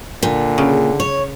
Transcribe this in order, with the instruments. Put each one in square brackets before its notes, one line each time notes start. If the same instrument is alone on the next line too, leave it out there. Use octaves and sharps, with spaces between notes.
[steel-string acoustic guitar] A#2 [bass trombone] D3
[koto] C#3
[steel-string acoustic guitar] C#5